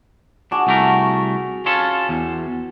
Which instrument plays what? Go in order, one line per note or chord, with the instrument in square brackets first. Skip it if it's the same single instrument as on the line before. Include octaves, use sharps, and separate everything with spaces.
[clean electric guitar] D4 [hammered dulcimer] F#4 G#4
[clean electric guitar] C2 A3 A#4
C#4 F4 A4
E2